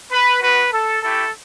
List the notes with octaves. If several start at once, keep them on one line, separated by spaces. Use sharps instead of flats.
B4
B3 F#4 B4
A4
A3 E4 G4 A4